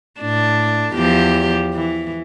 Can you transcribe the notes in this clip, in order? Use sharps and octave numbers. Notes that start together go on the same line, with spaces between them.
A2 D4
E2 F3 G4
E3